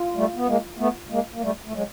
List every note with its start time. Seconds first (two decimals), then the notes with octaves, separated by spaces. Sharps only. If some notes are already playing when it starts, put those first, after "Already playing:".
Already playing: F4
0.15 G3 A3
0.36 B3
0.47 G#3 A#3
0.78 A3 B3
1.10 G#3 A#3
1.34 A#3
1.41 G3 A3
1.66 A3
1.73 F#3 G#3